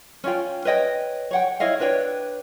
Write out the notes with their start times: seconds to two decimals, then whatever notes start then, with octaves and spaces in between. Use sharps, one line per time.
0.24 C#4 F4 G5
0.65 B4 C#5 D#5 G5
1.31 C#5 F#5 G5
1.60 E4 C#5 D#5 F5
1.80 D4 B4 C#5 G5